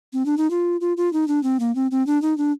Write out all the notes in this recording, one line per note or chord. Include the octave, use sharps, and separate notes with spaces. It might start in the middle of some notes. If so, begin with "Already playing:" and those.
C4
D4
D#4
F4
F4
F4
D#4
D4
C4
A#3
C4
C4
D4
D#4
D4